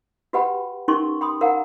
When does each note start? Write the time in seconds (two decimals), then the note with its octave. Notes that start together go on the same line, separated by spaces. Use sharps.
0.33 F#4 G4 B4 F#5 G5 B5
0.88 C#4 D#4 G4 A#4 C6 C#6
1.21 G5 B5 C6 D#6
1.41 A#4 F5 F#5 A#5